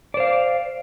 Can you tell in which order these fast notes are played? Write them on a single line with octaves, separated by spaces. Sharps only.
D5 C5 F5